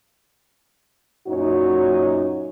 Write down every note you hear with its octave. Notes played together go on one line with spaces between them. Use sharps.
F#2 A#2 D#4 F#4 C#5